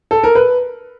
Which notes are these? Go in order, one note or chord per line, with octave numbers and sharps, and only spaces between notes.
A4
A#4
B4